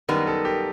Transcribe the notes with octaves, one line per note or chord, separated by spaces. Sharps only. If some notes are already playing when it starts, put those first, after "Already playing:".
F#2 D#3 G3 B3 D#4 A#4
A4
G4